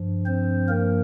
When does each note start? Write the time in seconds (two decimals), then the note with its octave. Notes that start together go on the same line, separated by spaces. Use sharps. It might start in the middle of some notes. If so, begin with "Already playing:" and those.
Already playing: G2 F3
0.26 C4 C5
0.68 A#3 A#4